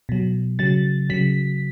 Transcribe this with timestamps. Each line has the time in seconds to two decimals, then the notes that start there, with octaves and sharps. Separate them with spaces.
0.09 B2 F#3
0.59 C#3 F#3 A6
1.10 C#3 F#3 B6